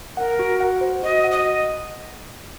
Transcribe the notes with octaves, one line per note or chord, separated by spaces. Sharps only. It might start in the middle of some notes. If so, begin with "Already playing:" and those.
A#4 F#5
F#4
F#5
C5
F#4 D#5
F#5
D#5